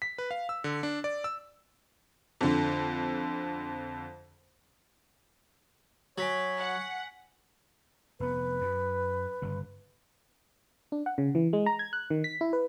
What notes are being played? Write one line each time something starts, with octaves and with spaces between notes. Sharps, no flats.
B6
B4
F5
E6
D3
D4
D5
E6
F2 D3
F#3 C#5 G#5 B6 F#7
F#5
F1 B3 B4
F#2
G1 G2 C#3
D4
F#5
C#3
E3
G#3
A#5
G#6
F#6
D#3
B6
E4
B4